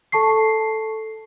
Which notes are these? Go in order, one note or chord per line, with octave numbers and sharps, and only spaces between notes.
A4 A5 C#6 C7